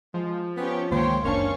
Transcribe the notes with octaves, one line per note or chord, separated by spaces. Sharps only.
F3 G#3
B3 C#4 G4 C#5
C#2 D#3 A#3 C5 C#5 G5
F#1 A2 A#3 C#4 D4 C#5 F5 C#6